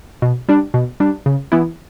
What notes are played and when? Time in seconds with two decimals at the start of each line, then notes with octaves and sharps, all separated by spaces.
0.22 B2
0.49 G3 D4
0.74 B2
1.00 G3 D4
1.26 C#3
1.52 E3 B3 E4